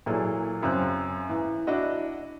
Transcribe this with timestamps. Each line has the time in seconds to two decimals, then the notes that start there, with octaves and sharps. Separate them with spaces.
0.06 A#2 E3 F#3 A#3 G#4 A4
0.63 F#2 C#3 C4 F#6
1.29 E3
1.67 D4 E4 F#4 D#5